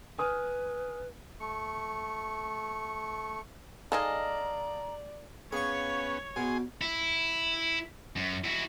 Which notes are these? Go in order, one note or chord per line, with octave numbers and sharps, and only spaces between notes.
B4 G#5 D#6 F6
A3 C#6
G#3 D#4 G#4 A4 D5 D#5 F5 A#5
B3 C#4 G#4 C#5 F5 C#6
B2 F#4 G#4 G#5 C6
E4
F#2
E4 F#4